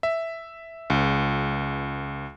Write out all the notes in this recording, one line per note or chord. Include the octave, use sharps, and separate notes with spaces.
E5
C#2